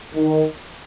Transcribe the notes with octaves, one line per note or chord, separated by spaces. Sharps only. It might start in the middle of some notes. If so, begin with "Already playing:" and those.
D#3